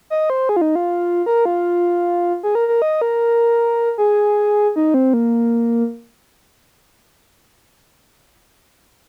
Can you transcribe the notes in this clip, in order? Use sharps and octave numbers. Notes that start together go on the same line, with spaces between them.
D#5
C5
G#4
F4
D#4
F4
A#4
F4
G#4
A#4
A#4
D#5
A#4
G#4
D#4
C4
A#3